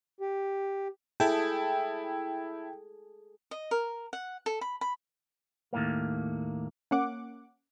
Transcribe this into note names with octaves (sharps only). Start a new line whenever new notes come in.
G4
E4 G#4 A4 G5 A5
D#5
A#4
F#5
A4
B5
B5
D#2 A2 A#3
A#3 C#4 F#5 D6